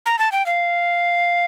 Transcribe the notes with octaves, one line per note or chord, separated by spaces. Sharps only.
A#5
A5
G5
F5